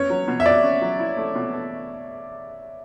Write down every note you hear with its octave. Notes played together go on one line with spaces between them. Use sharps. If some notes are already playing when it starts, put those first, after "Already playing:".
Already playing: B3 C#4 C#5
F#3
B2
E5
F#4 D5
C#4
F#3
E4
A3
B2
A4